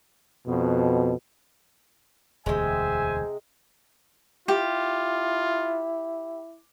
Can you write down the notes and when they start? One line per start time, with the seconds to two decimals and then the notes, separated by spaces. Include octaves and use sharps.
0.47 F2 B2
2.46 E1 D2 C3 G#3 C5 E5 G#5
4.48 E4 F4 G4